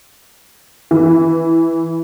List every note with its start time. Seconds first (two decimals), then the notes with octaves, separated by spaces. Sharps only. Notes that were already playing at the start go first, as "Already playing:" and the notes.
0.91 E3